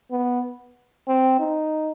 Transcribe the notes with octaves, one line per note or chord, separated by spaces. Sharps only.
B3
C4
D#4